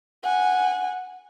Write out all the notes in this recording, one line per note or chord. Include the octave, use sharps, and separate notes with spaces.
F#5 G#5